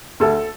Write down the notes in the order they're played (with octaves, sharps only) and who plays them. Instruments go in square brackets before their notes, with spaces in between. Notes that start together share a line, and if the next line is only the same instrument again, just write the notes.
[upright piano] D2 A4